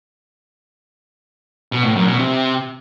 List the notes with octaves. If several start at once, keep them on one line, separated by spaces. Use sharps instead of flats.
B2
A2
F#2
B2
C3